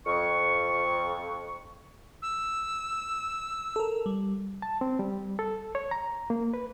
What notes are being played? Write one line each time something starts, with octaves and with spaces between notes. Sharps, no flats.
F2 C#6
E6
A4 A#4
G3
A5
C4
G3
A4
C#5
A#5
A#3
B4